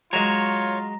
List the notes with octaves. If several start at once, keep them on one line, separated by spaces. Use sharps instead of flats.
F#3 G#3 F4 C#5 A#5 A#6